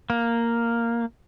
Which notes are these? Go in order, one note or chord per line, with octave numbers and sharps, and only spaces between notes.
A#3